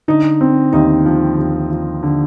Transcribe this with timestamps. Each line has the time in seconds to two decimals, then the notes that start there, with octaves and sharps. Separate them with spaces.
0.08 D3 D#4
0.41 C4
0.72 D#2 D#4
1.06 F3
1.38 D#2
1.71 F3
2.03 D3